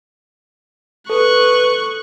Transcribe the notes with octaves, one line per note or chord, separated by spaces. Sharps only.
A4 B4 C#6 F#6